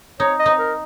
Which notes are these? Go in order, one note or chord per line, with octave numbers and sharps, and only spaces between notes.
D#4 C#5
D#5
D#4
A#4